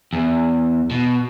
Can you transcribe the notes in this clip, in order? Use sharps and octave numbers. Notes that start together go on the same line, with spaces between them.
E2
B2